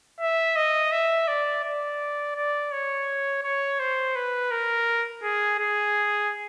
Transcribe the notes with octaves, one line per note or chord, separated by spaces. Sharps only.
E5
D#5
E5
D5
D5
D5
C#5
C#5
C5
B4
A#4
G#4
G#4